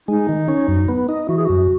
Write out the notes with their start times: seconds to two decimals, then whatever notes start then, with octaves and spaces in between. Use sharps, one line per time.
0.08 G#3 D#4
0.29 D#3
0.48 C#4
0.68 F#2
0.88 B3
1.09 D#4
1.29 E3 F#4
1.37 G#4
1.45 F#2 F#4